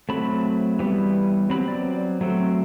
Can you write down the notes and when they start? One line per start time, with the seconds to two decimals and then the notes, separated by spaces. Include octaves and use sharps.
0.09 F#3 A3 C4 B5
0.79 E3 G3 B3
1.50 F#3 C4 B5
1.68 D5
2.21 F#3 A3 C4